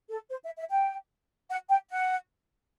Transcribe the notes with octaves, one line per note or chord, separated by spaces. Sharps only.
A4
C5
E5
E5
G5
F#5
G5
F#5